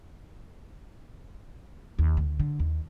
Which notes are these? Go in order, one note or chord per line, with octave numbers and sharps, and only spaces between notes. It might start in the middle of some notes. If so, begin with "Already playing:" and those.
D#2
D2
D3
D#2